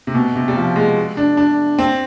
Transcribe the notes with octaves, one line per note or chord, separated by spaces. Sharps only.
C3
B2
C3
G3
F3
G#3
D4
D4
C4